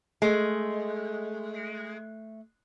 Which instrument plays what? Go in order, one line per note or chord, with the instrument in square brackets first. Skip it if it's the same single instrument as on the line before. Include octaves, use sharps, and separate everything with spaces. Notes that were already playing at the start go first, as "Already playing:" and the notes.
[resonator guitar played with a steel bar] G#3 [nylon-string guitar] A3 D#5